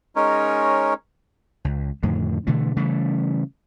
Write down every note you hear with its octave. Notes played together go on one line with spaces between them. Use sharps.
G#3 C#4 D#4 A#4 C#5
C#2
F2 A2 D3 D#3
B2 D3 E3 A3
C#3 E3 G3 A3